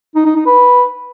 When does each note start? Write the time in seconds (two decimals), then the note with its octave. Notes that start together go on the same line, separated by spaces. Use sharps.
0.16 D#4
0.26 D#4
0.36 D#4
0.46 B4